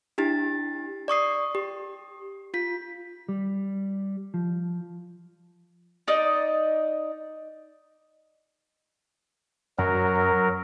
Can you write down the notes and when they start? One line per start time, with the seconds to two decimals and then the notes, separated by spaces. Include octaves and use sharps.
0.18 D4 E4 G4 A6
1.08 D5 C#6 D#6 C7
1.55 G4
2.54 F4 B6
3.29 G3
4.34 F3
6.08 D#4 D5 D#5
9.78 F#2 F#3 A#4